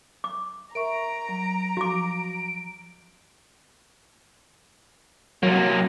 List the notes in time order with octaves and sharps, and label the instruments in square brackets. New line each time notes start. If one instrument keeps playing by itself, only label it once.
[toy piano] D6
[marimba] A#4 E5 C#6 [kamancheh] A#5 [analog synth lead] D7
[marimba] F#3
[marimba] F3 [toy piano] F#4 D6
[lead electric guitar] C3 A#3 [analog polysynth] F#3